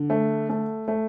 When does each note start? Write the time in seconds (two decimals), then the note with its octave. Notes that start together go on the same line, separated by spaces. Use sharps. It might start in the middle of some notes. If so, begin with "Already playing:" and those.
Already playing: D3
0.10 A3
0.49 A3
0.88 A3